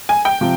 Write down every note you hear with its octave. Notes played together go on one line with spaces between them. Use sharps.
G#5
G5
C3 F3